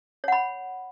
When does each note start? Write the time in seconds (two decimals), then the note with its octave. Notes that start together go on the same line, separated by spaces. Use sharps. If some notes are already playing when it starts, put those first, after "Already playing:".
0.24 C#5
0.28 F#5
0.32 B5